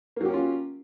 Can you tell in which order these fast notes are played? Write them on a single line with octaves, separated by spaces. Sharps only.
A#3 F#3 G4 C#4 F4